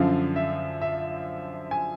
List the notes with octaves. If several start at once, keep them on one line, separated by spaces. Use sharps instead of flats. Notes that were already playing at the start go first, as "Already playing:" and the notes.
Already playing: F#2 D3 F3 F5
E5
E5
G#5